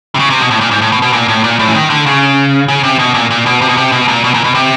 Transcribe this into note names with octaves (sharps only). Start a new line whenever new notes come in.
C3
C#3
C3
B2
A2
A#2
G#2
A2
B2
B2
A#2
A2
A#2
A2
E3
D#3
D3
C#3
C#3
C3
B2
A#2
A#2
B2
C3
B2
C3
B2
A#2
B2
A#2
B2
C3